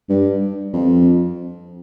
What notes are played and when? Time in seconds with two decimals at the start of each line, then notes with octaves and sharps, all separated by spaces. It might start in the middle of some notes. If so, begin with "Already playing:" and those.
0.09 G2
0.73 F2